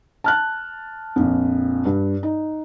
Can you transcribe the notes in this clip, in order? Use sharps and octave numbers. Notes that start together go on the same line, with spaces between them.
A5 F6 F#6
A#1 F2
G2
D#4